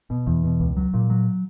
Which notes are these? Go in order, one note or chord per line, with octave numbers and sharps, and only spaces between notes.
B2
E2
B2
C#2
F#3
A#2
F#3